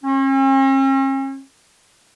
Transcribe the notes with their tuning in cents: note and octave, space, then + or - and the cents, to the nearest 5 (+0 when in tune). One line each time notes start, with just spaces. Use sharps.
C#4 -45